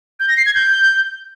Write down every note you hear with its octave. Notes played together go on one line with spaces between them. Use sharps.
G6
A#6
C7
G#6
G6